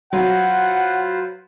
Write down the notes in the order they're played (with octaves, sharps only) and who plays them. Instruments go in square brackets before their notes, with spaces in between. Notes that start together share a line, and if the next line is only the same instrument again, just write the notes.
[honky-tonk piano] F#3 [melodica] F4 B4 C5 [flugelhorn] F#5